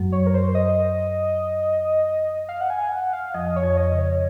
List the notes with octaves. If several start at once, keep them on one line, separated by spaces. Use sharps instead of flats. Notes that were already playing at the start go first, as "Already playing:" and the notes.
Already playing: F#2 F#3
C#5
A#4
C5
D#5
F5
F#5
G#5
F#5
F5
F2 F3 D#5
C#5
F2 F3
D#5
C#3
C#5